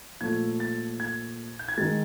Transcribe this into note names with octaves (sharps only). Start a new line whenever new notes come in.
A#2 F3 A3 G#6
A6
G#6
G6
G#6
D#3 G#3 A6